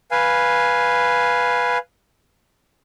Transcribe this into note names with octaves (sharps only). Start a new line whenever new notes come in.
B4 F5 G#5